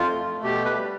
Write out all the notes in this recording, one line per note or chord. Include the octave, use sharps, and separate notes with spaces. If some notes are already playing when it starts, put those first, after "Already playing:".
Already playing: F2 F4
A3
B2 G4
B4
G3